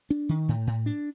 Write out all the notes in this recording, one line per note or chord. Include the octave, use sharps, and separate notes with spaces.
D4
D#3
A2
A2
D4